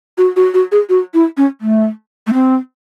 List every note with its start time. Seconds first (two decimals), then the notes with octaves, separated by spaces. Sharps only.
0.18 F#4
0.36 F#4
0.54 F#4
0.72 G#4
0.89 F#4
1.14 E4
1.37 C#4
1.61 A3
2.27 A3
2.33 C4